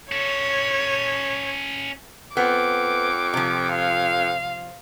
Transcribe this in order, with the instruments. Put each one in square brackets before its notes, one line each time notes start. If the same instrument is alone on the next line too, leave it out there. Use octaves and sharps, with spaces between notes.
[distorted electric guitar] C#4 A4 [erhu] C#5
[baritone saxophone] F2 [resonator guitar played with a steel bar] B3 [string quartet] D6
[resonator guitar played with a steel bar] C3 F3
[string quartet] F5